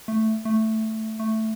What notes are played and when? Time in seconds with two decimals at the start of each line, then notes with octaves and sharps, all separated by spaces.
0.08 A3
0.45 A3
1.20 A3